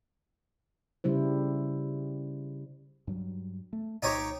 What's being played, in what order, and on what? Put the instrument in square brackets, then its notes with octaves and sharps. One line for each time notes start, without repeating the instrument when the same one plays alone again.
[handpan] C#3 G3 E4 C5
[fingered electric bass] G2 F#3 G3
A3
[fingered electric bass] C2 A#2 [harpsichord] D#4 G4 C#5